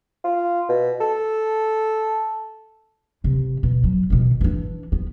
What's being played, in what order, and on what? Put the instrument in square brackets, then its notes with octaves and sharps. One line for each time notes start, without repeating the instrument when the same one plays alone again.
[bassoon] F4
B2
A4
[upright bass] C3 E3
B2
F#3
B2 D#3
E3 D4
B3